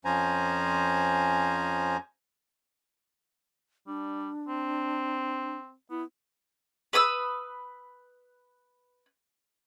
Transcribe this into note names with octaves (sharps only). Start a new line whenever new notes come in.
F2 F3 C#4 C5 G#5 A#5
G3 D4
C4
B3 E4
B4 B5 D#6 E6